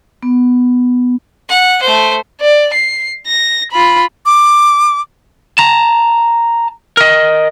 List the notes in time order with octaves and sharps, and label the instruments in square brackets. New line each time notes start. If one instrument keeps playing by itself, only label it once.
[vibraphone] B3
[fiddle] F#5
A3 C5
[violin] D5
C7
A#6
F4 B5
[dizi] D6
[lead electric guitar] A5 A#5
A#4 D#5